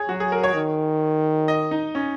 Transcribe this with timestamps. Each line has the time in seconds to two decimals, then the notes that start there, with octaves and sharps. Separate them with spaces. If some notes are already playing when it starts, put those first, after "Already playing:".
Already playing: G#4 C#5
0.09 F#3 F#4
0.20 G#4
0.32 A#4
0.43 C#5
0.55 D#3
1.48 D#5
1.71 D#4
1.95 C#4